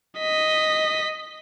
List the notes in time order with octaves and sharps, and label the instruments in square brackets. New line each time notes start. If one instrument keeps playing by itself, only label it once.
[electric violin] D#5 B6